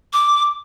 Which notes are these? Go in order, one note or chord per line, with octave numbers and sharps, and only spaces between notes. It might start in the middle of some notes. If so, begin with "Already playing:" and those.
D6